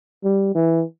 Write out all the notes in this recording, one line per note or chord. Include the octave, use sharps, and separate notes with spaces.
G3
E3